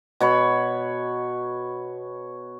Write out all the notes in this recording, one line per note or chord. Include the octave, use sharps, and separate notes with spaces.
B2 C#5 B5